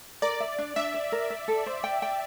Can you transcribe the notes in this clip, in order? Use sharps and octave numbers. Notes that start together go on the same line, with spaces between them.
A#4 D5
E5
D4
D4 E5
E5
A#4
E5
A4
C5
G5
G5